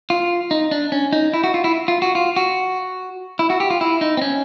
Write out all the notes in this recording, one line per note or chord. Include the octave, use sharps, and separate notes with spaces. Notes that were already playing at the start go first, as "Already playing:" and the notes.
F4
D#4
D4
C#4
D#4
E4
F#4
F4
E4
F4
F#4
F4
F#4
E4
F#4
G4
F4
E4
D#4
C4
C#4